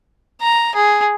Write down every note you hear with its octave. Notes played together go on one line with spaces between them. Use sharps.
A#5
G#4